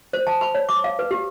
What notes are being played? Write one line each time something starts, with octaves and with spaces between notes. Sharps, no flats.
C5
A5
B5
C#5
D6
F5
B4
G4